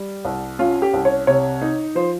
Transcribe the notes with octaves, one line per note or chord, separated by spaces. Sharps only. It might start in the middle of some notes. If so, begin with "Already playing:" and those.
Already playing: G3
C2
C#4 F4
G4
C2
C#5
C3 C#5
D#4
F3 C5